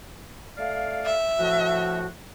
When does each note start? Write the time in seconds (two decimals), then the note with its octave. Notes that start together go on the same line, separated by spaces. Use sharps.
0.57 A3 D5 F5
1.06 E5
1.39 A2 F3 F#4